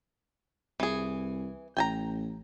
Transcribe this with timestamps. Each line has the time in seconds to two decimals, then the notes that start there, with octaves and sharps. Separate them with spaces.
0.80 C2 E3 G#4
1.77 A1 G5 G#5 A#5